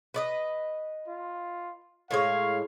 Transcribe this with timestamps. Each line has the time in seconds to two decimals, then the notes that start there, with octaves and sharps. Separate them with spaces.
0.14 B4 D5 D#5
1.08 F4
2.11 A2 G#3 C#5 F5